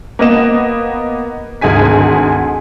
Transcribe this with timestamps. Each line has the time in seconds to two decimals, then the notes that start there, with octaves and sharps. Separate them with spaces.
0.19 A#3 B3 D#5 E7
1.61 G#1 D2 G#4 D#5 G#5 B6